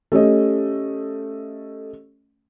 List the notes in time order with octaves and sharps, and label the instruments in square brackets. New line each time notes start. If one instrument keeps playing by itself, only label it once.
[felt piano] A3 C#4 G4 D#5